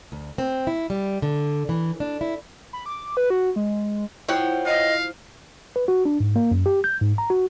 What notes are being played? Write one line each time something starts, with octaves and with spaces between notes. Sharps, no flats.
D2
C4
E4
G3
D3
E3
D4
E4
B5
D6
B4
F#4
G#3
F3 E4 C#5 F#5 G5
D#5 F5
B4
F#4
D4
G#2
A#3
F#2
G4
G6
G#2
A#5
F#4